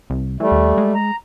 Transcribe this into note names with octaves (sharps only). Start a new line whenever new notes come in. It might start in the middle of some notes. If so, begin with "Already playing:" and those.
C2
E3 G3 A3
D#2
G#3
A#5